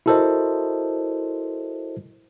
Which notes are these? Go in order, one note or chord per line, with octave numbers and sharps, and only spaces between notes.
E4 F#4 A4 A#4 C5 D#5